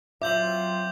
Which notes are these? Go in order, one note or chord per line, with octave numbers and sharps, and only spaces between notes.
F#3 C4 F4 E5 D6 G6 F#7